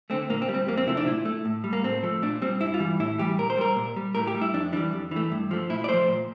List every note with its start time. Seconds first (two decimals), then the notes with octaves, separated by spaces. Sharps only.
0.10 D3 A3 C4
0.30 A#2 A#3
0.42 C4
0.49 G3
0.55 C4
0.67 F2 A#3
0.78 C4
0.87 C3 F3 A3 E4
0.97 D4
1.07 A#2 E4
1.25 A3
1.45 A2
1.64 G3
1.73 A#3
1.84 A2 C4
2.03 F3 A3
2.22 A#2 D4
2.42 G3 C4
2.61 G2 E4
2.74 F4
2.80 E3 G3
3.00 A2 E4
3.18 E3 G3 G4
3.38 A#2 A#4
3.50 C5
3.57 G3 A#4
3.76 A#2
3.97 G3
4.15 A2 A#4
4.27 G4
4.35 G3
4.41 E4
4.54 F2 D4
4.72 E3 G3 D4
4.93 F2
5.11 E3 A3
5.32 G2
5.51 F3 A3
5.70 A#2 E4
5.84 D5
5.89 F3 A3 C5
6.08 A#2